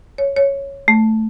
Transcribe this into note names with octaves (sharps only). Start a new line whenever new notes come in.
C#5
C#5
A3